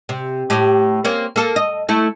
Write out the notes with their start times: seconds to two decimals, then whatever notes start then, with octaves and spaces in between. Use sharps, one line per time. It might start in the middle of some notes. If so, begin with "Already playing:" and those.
0.09 C3
0.50 A2 G4
1.05 A#3 C4 C#4
1.36 A#3 A4
1.56 D#5
1.89 A3 E4